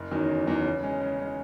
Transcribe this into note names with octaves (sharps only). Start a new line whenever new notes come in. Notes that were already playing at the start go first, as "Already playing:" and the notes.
Already playing: F#1
E2 D#3 F#3 C#4
F#1
E2 D#3 F#3 C#4
C#3
G#3 C#4
C#3
G#3 C#4